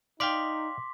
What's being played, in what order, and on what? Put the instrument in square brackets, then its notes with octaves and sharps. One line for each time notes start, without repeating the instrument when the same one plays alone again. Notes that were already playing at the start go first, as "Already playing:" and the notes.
[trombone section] D#4 [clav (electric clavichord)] D5 F5 G5 [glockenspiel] C6 D6 B6